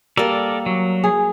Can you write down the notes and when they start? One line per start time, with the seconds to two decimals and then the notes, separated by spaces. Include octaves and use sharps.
0.17 G3 A#3 A4 A#4 D5
0.66 F#3
1.04 G#4